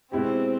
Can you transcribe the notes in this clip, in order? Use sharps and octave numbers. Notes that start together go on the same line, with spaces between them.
B2 G#3 B3 C4 E4 G4